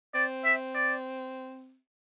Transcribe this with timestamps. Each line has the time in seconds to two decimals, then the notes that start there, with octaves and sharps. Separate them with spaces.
0.15 C4 D5
0.45 E5
0.75 D5